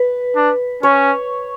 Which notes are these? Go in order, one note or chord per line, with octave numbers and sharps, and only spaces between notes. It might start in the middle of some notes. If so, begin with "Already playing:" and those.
Already playing: B4
D4
C#4 C#5